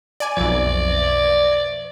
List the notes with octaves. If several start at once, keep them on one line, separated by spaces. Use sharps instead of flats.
D5 G#5
B1 F2 D5